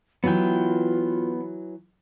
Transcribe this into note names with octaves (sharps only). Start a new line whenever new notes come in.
E3 F#3 B3 F4 G5